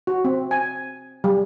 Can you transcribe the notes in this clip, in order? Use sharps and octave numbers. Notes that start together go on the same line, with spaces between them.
F#4
C4
G#5
G3